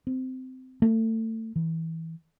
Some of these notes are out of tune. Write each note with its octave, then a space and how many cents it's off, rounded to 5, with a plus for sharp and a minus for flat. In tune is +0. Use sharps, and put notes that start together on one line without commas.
C4 -20
A3 +30
E3 -20